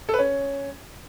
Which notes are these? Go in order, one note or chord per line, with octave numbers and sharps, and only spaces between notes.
A4
B4
C#4